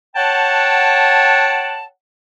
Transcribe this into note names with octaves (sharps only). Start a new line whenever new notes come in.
C#5 F#5 G5 A5